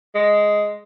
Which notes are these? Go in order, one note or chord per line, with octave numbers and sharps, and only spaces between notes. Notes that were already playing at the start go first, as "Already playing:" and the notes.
G#3